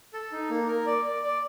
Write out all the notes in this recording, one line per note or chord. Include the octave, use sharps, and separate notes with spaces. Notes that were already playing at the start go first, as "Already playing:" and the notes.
A4
D#4
A#3
A#4
D5
D5
D5